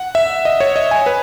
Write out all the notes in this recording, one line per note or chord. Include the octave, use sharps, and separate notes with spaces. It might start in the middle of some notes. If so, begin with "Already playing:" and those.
Already playing: F#5
E5
D#5
C#5
D#5
G#5
B4